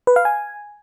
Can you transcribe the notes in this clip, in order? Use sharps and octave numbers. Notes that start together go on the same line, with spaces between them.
B4
F5
G#5